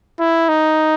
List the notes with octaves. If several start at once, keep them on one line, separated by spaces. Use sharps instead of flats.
E4
D#4